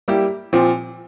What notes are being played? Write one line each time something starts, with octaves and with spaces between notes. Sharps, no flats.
G3 A#3 E4 G4
A#2 F3 C4